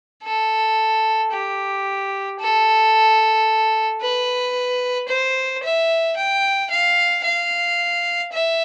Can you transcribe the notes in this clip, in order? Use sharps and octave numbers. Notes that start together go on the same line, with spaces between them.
A4
G4
A4
B4
C5
E5
G5
F5
F5
E5